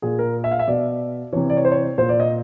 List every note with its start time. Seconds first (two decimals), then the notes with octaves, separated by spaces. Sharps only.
0.02 A#2 G#4
0.19 A#4
0.44 E5
0.51 F5
0.59 E5
0.68 B2 D5
1.33 C3 E3 C#5
1.50 D5
1.57 C#5
1.65 C5
1.72 C#5
1.98 A#2 C5
2.09 D5
2.20 D#5